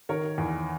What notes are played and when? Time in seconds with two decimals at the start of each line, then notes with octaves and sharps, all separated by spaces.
0.09 D#3 A#4 C#5
0.38 E2